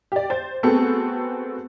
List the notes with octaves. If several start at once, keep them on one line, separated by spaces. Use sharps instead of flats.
G4 D5
C5 A6
A3 B3 C4 F#4 G#4 A4